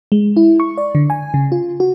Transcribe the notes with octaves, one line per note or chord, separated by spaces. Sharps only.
G#3
E4
C#6
D5
D3
G#5
C#3
F4
F#4